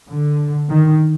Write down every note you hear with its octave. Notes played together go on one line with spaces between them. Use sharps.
D3
D#3